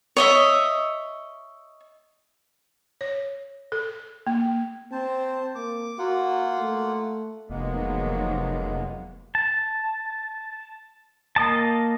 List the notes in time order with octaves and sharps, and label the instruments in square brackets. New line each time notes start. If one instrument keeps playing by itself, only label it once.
[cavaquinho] C#5 D#5 E5
[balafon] C#5
A4
A#3
[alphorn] C4 [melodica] C5 A5
[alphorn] A#3 [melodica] D6
[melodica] A#3 F4 F#5 [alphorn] F#4
[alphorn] A3
[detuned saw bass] F1 [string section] D#3 F3 F#3 [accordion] G#3 A#3 B3
[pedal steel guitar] A5
A#3 D#5 A5